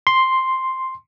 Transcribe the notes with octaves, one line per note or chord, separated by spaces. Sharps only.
C6